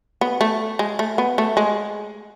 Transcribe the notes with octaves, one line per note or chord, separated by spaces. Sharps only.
B3
A3
G#3
A3
B3
A3
G#3